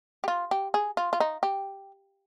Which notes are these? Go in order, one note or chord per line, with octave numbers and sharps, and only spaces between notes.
G4
F4
G4
G#4
F4
F4
D#4
G4